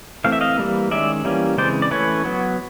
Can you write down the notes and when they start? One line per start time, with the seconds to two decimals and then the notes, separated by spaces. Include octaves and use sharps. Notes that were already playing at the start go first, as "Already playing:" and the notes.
0.24 E3 A3 C4 F5
0.32 E5
0.41 D#5 F5
0.58 E3 G3 A#3
0.91 D#3 G#3 C#4 D5 E5
1.25 E3 G3 A#3 C#4
1.57 C#3 E3 G#3 C4 C5 D5
1.82 D5
1.91 E3 A3 C#4 B4 C#5
2.25 F#3 B3